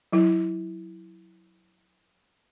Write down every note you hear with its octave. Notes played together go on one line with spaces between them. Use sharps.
F#3 E4